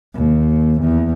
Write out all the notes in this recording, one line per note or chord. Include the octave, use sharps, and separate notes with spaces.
D#2
E2